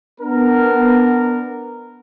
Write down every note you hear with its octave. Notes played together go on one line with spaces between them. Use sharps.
B3 D4 A#4